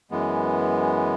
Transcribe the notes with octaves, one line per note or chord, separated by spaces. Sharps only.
F#2 E3 G#3 B3